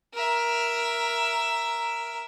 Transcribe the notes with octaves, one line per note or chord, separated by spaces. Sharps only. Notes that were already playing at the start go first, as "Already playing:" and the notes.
A#4 E5